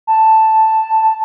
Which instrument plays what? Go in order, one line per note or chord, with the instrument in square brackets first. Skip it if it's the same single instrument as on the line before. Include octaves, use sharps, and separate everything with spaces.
[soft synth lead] A5